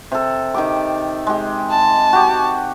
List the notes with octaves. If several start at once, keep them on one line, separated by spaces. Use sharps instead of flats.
C3 A4
D#3 G4 D6
G#3 G4
A5
F#4 G4